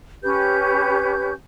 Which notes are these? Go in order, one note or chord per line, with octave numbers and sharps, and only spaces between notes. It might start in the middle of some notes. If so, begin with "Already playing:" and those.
C#4 G4 B4 G6